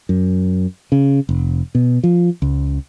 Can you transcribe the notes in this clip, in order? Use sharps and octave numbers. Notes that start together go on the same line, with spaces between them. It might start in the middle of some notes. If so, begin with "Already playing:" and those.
F#2
C#3
F1
B2
F3
C#2